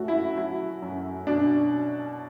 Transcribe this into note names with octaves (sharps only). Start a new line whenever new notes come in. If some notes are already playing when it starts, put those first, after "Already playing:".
Already playing: F#2 A3 F#4
E4
F#3 E4
F#2
B2 D4